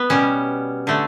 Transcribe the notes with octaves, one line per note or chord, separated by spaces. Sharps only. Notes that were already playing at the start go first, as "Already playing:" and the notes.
Already playing: B3
B2 G3 C#4
D3 A3